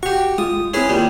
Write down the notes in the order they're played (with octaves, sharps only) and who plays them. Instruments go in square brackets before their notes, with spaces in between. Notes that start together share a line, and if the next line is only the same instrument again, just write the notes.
[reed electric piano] F#4 [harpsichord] G4 C#6
[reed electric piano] G#3 F4 [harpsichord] D#6
[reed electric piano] C4 E4 [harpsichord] C#4 G#4 B4
[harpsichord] D#2 G3 [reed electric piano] F4